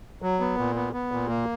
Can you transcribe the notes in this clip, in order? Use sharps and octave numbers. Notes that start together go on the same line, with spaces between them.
F#3
B3
A#2
B3
B3
A#2
A#3